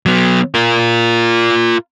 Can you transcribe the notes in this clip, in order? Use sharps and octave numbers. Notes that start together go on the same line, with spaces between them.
F#3 B3
F4 A#4